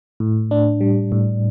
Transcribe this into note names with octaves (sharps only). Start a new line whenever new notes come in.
A2
D4
G3
A2